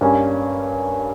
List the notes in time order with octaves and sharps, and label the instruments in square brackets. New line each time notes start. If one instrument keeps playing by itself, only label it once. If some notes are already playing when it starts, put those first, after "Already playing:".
[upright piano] G2 [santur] G3 A#3 C#4